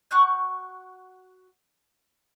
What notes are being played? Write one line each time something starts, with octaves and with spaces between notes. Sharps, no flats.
F#4 C#6 F#6 G6